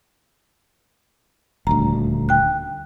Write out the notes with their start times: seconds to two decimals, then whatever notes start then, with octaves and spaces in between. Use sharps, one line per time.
1.67 D#1 D2 A#5
2.29 G5 F#6